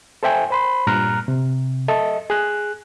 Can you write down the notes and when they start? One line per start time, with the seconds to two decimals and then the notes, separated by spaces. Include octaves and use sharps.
0.23 A4 C5 E5 G5 G#5
0.50 C5 B5 C6
0.87 G2 A#2 A#5 F6 F#6
1.28 C3
1.88 A4 D#5 E5
2.30 G#4 F#6